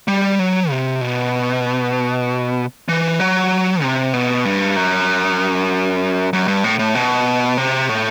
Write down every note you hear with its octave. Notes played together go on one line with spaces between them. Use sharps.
G3
F#3
C3
B2
E3
F#3
C3
B2
G2
F#2
F#2
G2
A2
A2
B2
C3
A2